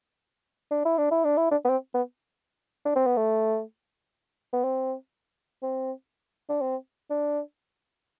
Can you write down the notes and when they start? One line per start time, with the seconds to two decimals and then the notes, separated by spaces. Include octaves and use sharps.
0.71 D4
0.85 E4
0.98 D4
1.11 E4
1.24 D4
1.38 E4
1.51 D4
1.65 B3
1.69 C4
1.94 B3
2.85 D4
2.96 C4
3.07 B3
3.17 A3
4.53 B3
4.64 C4
5.62 C4
6.49 D4
6.61 C4
7.10 D4